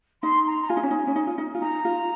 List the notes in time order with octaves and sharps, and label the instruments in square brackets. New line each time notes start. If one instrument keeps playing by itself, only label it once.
[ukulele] D#4 [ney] C6
[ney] A#5
A#5
[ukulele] F4 [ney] G#5
[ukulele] D#4
C#4
D#4
C#4
D#4
F4
D#4
F4
[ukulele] D#4 [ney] A#5
[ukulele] F4